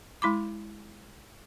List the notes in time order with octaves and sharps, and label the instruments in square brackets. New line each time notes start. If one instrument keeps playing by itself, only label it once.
[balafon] G#3 E4 B5 D6